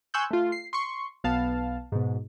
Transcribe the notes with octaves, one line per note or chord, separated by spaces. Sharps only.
G#5 C6 C#6 E6 F#6 G6
A3 F4
C7
C6 C#6
B1 B3 F5 A5
G#2 B2